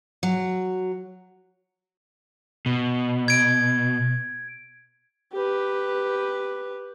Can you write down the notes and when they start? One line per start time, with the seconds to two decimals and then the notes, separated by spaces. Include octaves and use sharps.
0.23 F#3
2.66 B2
3.28 G#6 D7
5.33 G4 B4